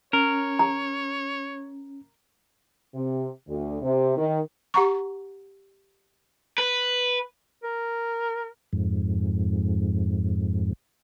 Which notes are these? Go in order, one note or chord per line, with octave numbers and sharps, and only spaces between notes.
C#4 A#4 C#5
A#5
C3
D2
C3
D#3
G4 F#5 A#5 C#6
B4
A#4
F2 G#2